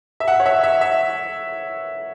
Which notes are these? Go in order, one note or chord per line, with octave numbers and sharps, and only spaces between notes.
E5
F#5
C#5
E5
E5
E5